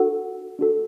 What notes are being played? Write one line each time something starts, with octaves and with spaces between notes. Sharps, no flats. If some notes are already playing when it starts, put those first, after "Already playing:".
Already playing: D4 F#4 A4 F#5
D4 F#4 A4